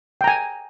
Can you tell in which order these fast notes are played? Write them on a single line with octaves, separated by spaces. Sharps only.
G5 A#5 G#5